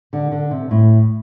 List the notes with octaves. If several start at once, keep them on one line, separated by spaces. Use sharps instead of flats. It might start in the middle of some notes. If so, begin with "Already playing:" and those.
D3
D3
C3
A2